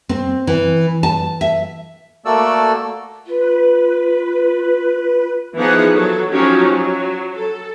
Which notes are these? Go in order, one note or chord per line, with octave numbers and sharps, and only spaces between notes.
C4
E3
A5
E5
A3 A#3 F#4 A4 D5 E6
F4 B4
E3 F3 B3 D#4 G#4 F#5
F#3 A4
F3 F#3 C#4 D#4 F#4 G4
F#3
A4